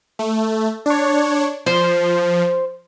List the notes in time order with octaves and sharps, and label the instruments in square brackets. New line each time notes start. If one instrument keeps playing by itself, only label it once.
[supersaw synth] A3
D4 C#5
[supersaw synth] F3 [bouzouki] C5